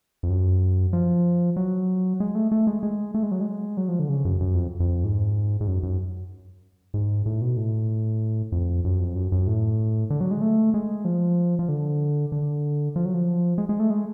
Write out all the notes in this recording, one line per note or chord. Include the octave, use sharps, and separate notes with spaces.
F2
F#2
F3
F#3
G#3
A3
A3
G#3
G#3
A3
G#3
F#3
G#3
F#3
F3
D3
C#3
F#2
F#2
F2
F2
G#2
G#2
F#2
F#2
G#2
A2
B2
A2
F2
F#2
F2
F#2
F#2
A2
D3
F#3
G#3
A3
G#3
F3
F3
D3
D3
F3
F#3
F3
G#3
G#3
A3
G#3